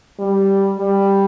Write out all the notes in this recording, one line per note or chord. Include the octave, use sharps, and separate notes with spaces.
G3
G3